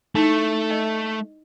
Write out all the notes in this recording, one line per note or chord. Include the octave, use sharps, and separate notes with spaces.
A3 D#4 E4
D#5